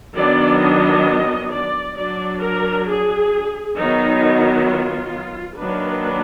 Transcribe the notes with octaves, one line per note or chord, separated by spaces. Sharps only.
D#3 F#3 B3 D4 D5
D#5
D5
F#3 D4 D5
A#4
G#4
D#3 F#3 B3 D#4
F4
D#3 F#3 A#3 D4 B4